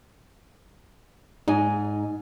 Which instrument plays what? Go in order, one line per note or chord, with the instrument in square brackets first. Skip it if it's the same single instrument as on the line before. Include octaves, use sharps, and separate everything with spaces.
[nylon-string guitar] G#2 D#5 G#5 [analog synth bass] D#4